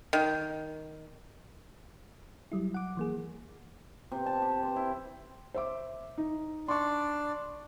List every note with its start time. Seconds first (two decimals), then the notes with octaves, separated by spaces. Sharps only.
0.13 D#3
2.52 F#3 G3 E4
2.74 F#5 D6
2.97 E3 A#3 G#4
4.12 C3
4.26 A5
4.42 G4
4.63 C5
4.76 E4
5.54 C5 E5 D6
6.18 D#4
6.68 D4 D5 C6 C#6